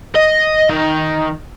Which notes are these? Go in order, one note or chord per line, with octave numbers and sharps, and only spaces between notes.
D#5
D#3